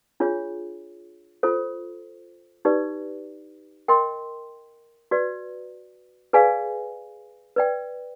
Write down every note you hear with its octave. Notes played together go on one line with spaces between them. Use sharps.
D4 F4 G#4 C#5
F4 A4 C5
D#4 G4 B4 D5
A#4 D#5 G5 C6
F#4 B4 D5
G#4 B4 D5 F5 G#5
B4 D5 G5